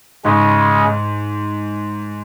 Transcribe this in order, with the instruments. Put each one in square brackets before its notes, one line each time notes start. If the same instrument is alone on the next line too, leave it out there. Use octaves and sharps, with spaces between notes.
[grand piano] G#2 [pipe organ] C#3 G#3 C#4